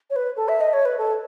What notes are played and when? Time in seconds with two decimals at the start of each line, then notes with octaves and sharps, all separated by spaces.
0.10 C#5
0.16 B4
0.36 A4
0.48 E5
0.60 D#5
0.73 C#5
0.85 B4
0.98 A4